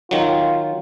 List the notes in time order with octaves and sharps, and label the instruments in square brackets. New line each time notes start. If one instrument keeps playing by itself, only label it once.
[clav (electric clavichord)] D#3 F#3 [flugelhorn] F4